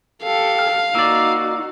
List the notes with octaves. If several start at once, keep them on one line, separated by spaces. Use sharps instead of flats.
G4 A4 F5
F6
A#3 D#4 F#4 D5 E6